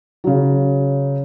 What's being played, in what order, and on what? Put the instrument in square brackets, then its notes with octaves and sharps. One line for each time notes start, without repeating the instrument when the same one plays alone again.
[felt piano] C#3 F#3